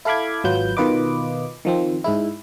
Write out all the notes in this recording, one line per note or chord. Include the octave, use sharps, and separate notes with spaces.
E4 A4 F5 B5 D6 G#6
G#1 F#3 F4 B4 G6
B2 D#3 F4 B4 D#5 D6
D#3 F3 C4
G#2 G#3 E4